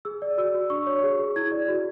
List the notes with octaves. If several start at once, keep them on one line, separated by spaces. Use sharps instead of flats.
G#4 E6
D5
F#4 E6
F#4
D4 C#6
C#5
G#4
G#4
E4 G#6
D5
F#4